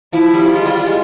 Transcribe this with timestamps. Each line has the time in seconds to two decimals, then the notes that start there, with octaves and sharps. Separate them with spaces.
0.13 F3 E4
0.34 G3
0.54 G#3 F4
0.66 G3
0.77 G3
0.86 G#3